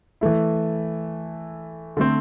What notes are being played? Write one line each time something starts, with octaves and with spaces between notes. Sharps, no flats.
E3 A3 E4
D3 A3 C4